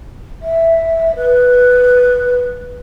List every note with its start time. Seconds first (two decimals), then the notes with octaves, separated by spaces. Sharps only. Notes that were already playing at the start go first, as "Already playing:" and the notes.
0.42 E5
1.16 B4